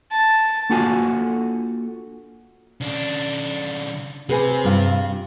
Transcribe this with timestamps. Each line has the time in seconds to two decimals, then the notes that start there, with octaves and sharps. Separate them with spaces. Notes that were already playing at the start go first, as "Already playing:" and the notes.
0.11 A5
0.70 A#3 D4 F4 F#4 A4 G#5
2.81 C#3 D4
4.29 C3 G#4 B4 G#5
4.64 G2 F4